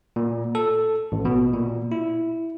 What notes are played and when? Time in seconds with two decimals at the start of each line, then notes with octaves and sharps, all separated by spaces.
0.16 A#2
0.55 A4
1.12 A1
1.25 B2
1.53 A#2
1.92 E4